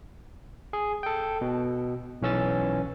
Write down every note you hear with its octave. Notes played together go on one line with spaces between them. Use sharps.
G#4
A4 G5
B2
B1 E3 C#4 E6 A6